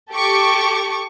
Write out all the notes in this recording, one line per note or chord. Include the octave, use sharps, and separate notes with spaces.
G4 A4 C#6 D6